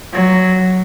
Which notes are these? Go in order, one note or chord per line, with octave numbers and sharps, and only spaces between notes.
F#3